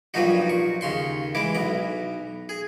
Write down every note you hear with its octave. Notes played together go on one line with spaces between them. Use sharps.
G2 A#2 F3 F#3 D#4 F#4
C#6
D#2 C#3 C6 C#6
E3 G#3 E4 D6
B1 B3 A#5
G#4